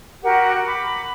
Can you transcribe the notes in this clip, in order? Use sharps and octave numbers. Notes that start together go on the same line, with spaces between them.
F#4 G4 A#4 F#5
B5 D6